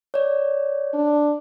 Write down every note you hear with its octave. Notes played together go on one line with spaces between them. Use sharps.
C#5 D5
D4